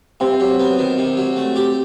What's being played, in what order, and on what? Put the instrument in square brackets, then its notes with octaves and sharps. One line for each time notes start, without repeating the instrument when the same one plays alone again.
[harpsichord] C3 [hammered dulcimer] C4
[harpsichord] F#3
B3
D#3
C3
F#3
A3
G4